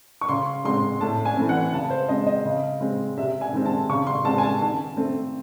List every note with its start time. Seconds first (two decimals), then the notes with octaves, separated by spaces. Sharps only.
0.21 C#6
0.29 C#3 C6
0.64 G#3 C4 C6
1.01 A2 A5
1.25 G#5
1.37 E3 A3 C4
1.49 F#5
1.73 C#3 A5
1.90 C5
2.09 G#3 C4 D#5
2.26 D#5
2.45 C#3
2.81 G#3 C4
3.17 C3 E5
3.41 G#5
3.54 D#3 G#3 C4
3.66 A5
3.89 C#3 C#6
4.07 C6
4.25 G#3 C4 A5
4.38 G#5
4.43 A5
4.62 D#3 A5
4.97 A3 C4